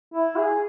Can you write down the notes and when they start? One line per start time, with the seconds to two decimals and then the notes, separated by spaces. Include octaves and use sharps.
0.14 E4
0.36 G#4